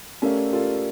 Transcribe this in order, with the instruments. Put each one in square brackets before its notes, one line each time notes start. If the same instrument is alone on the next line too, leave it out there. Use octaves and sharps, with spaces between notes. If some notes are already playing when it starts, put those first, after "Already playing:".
[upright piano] A3 C#4 [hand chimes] G4 A#4 D5 F5
[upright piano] F4 A4 [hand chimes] G4 A#4 D5 F5